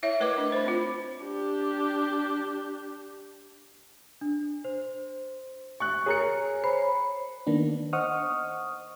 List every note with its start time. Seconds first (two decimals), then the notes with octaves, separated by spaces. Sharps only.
0.03 E4 C#5 E5
0.20 A3 A#4 B4 D#5 D6
0.38 D4
0.52 C5 B5
0.64 C4 F4
1.25 D4 G4
4.21 D4
4.64 C5
5.80 C#6 F#6
6.06 G#4 A#4 C#5 C#7
6.64 C5 C#5 B5
7.47 D#3 A#3 B3 D4
7.93 C5 D#5 F#5 C#6 D#6 F6